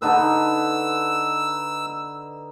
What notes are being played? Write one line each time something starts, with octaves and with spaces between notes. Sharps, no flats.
D3 D#4 B4 E6